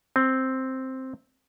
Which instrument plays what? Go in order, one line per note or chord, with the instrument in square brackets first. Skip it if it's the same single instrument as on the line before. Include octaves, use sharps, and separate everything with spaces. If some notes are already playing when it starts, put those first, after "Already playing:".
[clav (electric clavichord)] C4